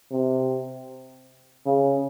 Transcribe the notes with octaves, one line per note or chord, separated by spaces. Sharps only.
C3
C#3